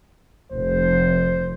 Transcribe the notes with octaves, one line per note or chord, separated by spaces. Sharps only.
F1 C5